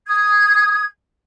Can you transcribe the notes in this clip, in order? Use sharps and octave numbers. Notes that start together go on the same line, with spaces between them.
D#6 G#6